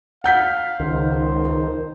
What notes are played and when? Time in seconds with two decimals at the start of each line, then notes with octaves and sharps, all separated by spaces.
0.24 F5 F#5 G6 B6
0.80 C#2 D#3 C5